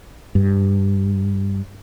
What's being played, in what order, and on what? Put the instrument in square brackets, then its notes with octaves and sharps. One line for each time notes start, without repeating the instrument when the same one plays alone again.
[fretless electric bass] G2